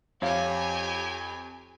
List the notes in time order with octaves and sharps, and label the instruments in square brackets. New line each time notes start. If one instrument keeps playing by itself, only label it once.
[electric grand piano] F2 [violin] G4 G#5 [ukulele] C#5 F5